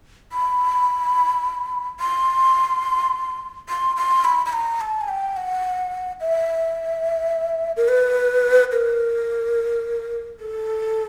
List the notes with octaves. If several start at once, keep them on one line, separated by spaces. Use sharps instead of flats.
B5
C6
C6
C6
B5
B5
A#5
A5
G#5
G5
F#5
E5
A#4
B4
A#4
A4